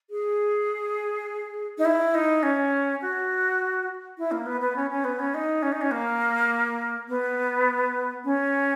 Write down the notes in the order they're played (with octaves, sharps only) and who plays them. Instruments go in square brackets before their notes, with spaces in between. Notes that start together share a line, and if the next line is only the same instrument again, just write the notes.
[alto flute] G#4
D#4
E4
D#4
C#4
F#4
E4
A#3
B3
B3
C#4
C#4
B3
C#4
D#4
C#4
D#4
C#4
A#3
B3
C#4